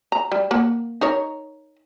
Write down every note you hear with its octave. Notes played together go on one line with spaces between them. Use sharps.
A#5
G3
A#3 F#5
D#4 A#4 C#5